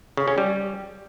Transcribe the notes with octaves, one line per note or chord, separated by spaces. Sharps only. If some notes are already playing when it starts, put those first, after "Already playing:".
C#3
C#4
G3